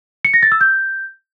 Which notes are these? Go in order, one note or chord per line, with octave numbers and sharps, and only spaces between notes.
C#7
A#6
A6
E6
G6